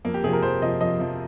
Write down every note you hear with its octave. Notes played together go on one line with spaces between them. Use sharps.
F2 A#3
G4
C3 F3 G#4
A#4
F2 C5
C3 F3 D#5
F2 D#5
C3 F3